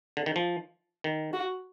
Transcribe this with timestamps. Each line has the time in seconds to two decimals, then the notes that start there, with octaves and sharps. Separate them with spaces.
0.17 D3
0.26 D#3
0.36 F3
1.04 D#3
1.33 F#4